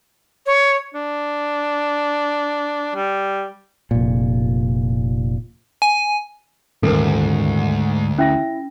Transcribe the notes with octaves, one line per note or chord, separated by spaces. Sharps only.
C#5
D4
G3
F1 A#2
G#5
D#1 D2 G#2 A4 A#4
C#4 E4 E5 A#6